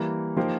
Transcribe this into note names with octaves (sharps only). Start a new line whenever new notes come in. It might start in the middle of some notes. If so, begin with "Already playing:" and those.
Already playing: E3 G3 A#3
F3 A#3 D#4 G4 C5